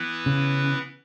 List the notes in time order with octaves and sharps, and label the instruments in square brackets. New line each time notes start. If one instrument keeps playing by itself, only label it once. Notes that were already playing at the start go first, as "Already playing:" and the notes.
Already playing: [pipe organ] E3 B3 E4 B4
[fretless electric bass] C#3